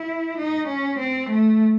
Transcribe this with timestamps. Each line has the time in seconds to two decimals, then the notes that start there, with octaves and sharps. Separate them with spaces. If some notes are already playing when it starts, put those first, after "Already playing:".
Already playing: E4
0.38 D#4
0.68 C#4
0.99 C4
1.29 A3